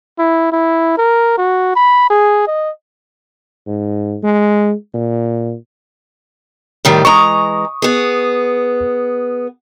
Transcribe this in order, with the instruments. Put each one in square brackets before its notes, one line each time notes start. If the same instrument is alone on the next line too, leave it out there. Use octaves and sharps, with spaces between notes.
[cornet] E4
E4
A#4
F#4
B5
G#4
D#5
[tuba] G#2
G#3
A#2
[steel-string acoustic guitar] A2 D#3 G3
[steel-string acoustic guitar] E3 G#3 A#5 [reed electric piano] C#6 D#6
[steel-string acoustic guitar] B3 G#4